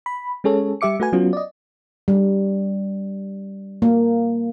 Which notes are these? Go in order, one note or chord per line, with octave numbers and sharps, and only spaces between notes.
B5
G#3 C#4 G#4 A4 C#5
G3 G4 E5 D6 C#7
A3 F#4 B4 G#5
F#3 B3 C#4 F4 F#4
D5 D#5
G3
A#3